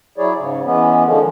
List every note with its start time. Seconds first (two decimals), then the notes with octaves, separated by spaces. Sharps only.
0.18 F#3 E4 G#4 C#5 D5
0.38 G#2 C#3
0.64 E3 G#3 B3 C#4
1.05 D3 D#3 F3 G#3 C#4